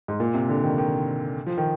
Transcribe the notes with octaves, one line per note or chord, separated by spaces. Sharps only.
G#2
A#2
C3
D3
D#3
D#3
F3
D#3